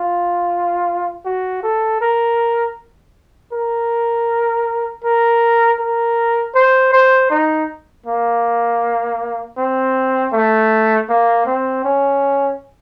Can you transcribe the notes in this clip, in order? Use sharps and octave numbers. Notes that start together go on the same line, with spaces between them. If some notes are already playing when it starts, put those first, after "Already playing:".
Already playing: F4
F#4
A4
A#4
A#4
A#4
A#4
C5
C5
D#4
A#3
C4
A3
A#3
C4
C#4